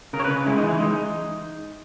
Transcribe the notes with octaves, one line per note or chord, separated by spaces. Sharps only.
C#3 A#4
C#5
B4
C#3
G#3 E4
D#4
E3
E4
G#3 D#4